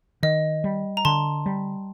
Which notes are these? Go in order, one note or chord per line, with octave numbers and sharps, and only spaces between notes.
D#3 D#5
G3
A#5
D3 A5 C6
G3